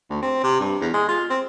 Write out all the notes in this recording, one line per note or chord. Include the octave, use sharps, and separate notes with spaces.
D2
C4
C3
G2
E2
G#3
F4
C4